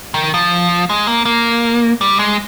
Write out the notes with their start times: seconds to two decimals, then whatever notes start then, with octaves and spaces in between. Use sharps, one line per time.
0.14 D#3
0.34 F3
0.90 G#3
1.07 A#3
1.25 A#3
2.01 G3
2.19 G#3